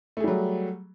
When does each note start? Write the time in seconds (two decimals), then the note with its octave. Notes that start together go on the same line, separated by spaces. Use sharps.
0.17 A3
0.20 G#4
0.24 G3
0.28 F#3